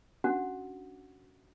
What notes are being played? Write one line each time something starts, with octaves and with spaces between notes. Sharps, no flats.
C#4 D4 F#4 F#5